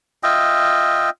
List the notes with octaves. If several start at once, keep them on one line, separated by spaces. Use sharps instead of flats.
F4 D#5 E5 G5